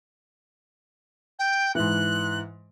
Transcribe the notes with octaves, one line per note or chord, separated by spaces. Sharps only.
G5
G#2 E3 F#6